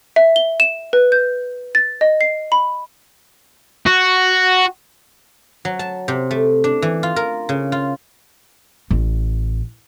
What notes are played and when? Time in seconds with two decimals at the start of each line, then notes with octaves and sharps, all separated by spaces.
0.16 E5
0.36 G7
0.60 E7
0.93 B4
1.12 G6
1.75 A6
2.01 D#5
2.21 C7
2.52 B5
3.87 F#4
5.65 F#3
5.79 A5
6.08 C3
6.31 A3
6.64 D4
6.82 E3
7.03 F4
7.16 A#4
7.49 C#3
7.72 F4
8.91 A1